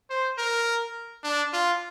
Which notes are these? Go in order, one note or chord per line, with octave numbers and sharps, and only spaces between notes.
C5
A#4
D4
F4